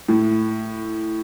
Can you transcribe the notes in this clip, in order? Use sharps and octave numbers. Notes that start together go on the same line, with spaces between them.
A2